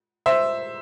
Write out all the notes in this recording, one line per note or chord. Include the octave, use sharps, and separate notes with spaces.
C5 E5